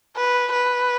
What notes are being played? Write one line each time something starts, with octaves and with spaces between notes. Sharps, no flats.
B4
B4